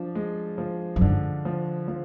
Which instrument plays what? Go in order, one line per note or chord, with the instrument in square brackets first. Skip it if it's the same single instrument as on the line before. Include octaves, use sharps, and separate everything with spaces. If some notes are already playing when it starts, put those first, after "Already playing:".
Already playing: [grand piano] F3 D4
G#3
F3
[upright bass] F#2
[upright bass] G#2 [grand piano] D3
[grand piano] F3
F3